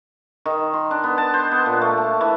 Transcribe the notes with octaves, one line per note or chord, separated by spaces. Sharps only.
D#3
C6
D4
B3
A5
C5
B3
A#2
A3
A5
E3